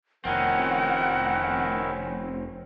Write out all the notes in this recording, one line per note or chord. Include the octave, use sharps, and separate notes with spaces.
F1 D#3 C4 C#4 E4 A#4 F#5